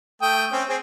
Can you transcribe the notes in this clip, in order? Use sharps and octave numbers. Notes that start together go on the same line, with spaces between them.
A3 G5 D#6
C4 C#4
C4 G#4